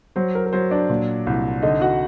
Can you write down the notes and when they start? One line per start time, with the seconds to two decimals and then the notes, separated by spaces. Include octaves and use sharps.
0.16 F#3 C5
0.35 A#4
0.46 A#4
0.53 F#3 C5
0.71 D4 D5
0.90 A#2
1.27 C2
1.62 D3 D#4 D#5
1.81 F#4 F#5